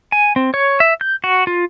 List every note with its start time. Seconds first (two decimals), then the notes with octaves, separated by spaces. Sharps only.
0.12 G#5
0.36 C4
0.54 C#5
0.80 E5
1.01 G6
1.24 F#4
1.47 F4